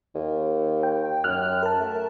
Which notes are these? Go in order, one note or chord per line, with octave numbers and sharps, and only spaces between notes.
D#2
G5
F#2 F6 F#6
A#4 A5
A3